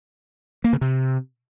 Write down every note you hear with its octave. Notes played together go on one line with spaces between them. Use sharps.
A#3
C#3
C3